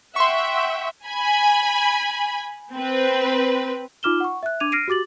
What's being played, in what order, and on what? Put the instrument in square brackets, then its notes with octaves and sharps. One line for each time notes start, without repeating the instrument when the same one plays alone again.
[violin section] E5 F#5 G5 [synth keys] C6 C#6
[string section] G#5 B5
C4 B4
[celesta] D#4 F4 D6 F6 E7 G7
F#5 C#6
E5 F#6
D4 D6 G#6 D#7 F7
F6 A#6 C7 D7 D#7
F#4 G4 D6 A6 F#7